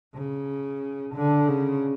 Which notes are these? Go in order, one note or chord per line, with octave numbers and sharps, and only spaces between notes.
C#3
D3
C#3